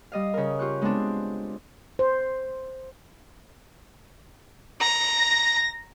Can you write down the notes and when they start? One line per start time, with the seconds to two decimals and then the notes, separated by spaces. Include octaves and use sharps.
0.12 G3 D#5 F5
0.34 C#3 A#4
0.59 F4 G4 C#6 F#6
0.82 G#3 B3 C4 D4
1.99 C5
4.81 A#5
5.16 A#6